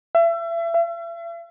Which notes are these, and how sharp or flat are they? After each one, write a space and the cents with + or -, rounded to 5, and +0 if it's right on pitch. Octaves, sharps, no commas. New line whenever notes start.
E5 +35
E5 +45